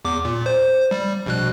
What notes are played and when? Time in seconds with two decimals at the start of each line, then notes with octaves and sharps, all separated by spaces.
0.05 E2 D6
0.25 A#2
0.46 C5
0.91 G3
1.26 A#1 B2 F#6